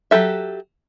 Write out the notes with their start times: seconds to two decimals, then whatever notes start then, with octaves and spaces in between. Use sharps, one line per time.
0.11 F#3 G4 A4 E5